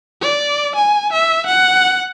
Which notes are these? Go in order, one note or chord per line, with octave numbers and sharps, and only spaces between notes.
D5
G#5
E5
F#5